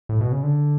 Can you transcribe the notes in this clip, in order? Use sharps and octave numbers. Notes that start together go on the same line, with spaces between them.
A2
B2
C#3
D3